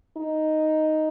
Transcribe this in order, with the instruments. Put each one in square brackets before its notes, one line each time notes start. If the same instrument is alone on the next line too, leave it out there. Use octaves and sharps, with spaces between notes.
[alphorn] D#4